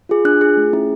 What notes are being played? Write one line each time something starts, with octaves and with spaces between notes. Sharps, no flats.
F4 G#4
D4 F#6
F4 G#4
A3
C#4 E4 G#4